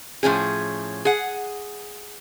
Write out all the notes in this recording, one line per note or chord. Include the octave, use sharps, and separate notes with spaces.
A2 F3 C#4 G#4
G#4 F#5